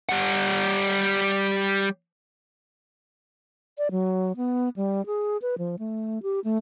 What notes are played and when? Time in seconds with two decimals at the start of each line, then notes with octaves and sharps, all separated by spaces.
0.09 G3 F#5
3.78 D5
3.91 F#3
4.37 B3
4.76 G3
5.06 G#4
5.42 B4
5.58 F3
5.79 A3
6.23 G4
6.44 A3